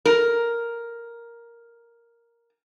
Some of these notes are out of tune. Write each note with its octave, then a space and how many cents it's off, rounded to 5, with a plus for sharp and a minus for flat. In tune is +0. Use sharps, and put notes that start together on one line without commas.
A#4 +5